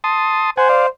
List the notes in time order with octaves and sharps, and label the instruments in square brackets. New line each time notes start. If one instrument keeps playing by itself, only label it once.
[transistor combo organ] A5 C6 D#6
[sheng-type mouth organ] C5 [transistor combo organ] F#5 G#5
[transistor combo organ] D5 F5